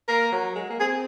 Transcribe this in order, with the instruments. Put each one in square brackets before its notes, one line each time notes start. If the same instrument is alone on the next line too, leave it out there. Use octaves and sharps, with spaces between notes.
[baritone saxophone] A#3 [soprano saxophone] A#4
[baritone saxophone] F#3
G#3
A#3
[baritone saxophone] C4 [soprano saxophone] G#4